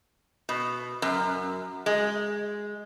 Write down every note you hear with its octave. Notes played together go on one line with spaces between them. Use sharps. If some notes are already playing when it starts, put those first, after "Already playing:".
B2
F#2
G#3